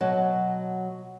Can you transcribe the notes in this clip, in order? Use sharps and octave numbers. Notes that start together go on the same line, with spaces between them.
B2 F#3 D#5 A5